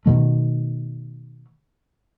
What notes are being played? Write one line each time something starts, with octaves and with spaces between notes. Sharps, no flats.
B2 D#3 A3